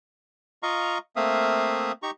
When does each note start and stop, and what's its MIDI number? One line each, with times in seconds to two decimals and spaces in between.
0.63 0.98 65
0.63 0.98 75
0.63 0.98 77
0.63 0.98 82
0.63 0.98 85
1.16 1.92 57
1.16 1.92 58
1.16 1.92 60
1.16 1.92 76
1.16 1.92 77
1.16 1.92 87
2.03 2.11 63
2.03 2.11 67
2.03 2.11 82
2.03 2.11 85